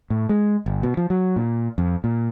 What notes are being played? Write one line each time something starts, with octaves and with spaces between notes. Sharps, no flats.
A2
G#3
G1
B2
F3
F#3
A#2
F2
A#2